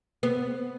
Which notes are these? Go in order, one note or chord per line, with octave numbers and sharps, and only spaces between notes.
B3